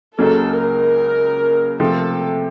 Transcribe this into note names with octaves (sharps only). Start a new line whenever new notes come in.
C#2 C#3 F#3 A#3 A4
A#4
C3 F3 A3 A4